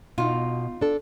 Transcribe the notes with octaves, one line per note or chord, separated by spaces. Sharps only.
B2 D#4 F4
D4 A4